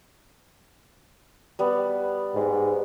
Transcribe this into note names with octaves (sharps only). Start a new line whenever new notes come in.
G3 B3
G#2